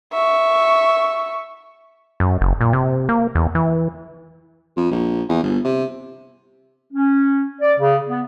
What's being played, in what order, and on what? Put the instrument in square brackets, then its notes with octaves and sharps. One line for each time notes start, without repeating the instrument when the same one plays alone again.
[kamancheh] E5 C#6
[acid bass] F#2
F#1
A#2
C3
A#3
E2
E3
[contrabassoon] F2
A#1
E2
G1
C3
[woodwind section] C#4
D5
C#3
B3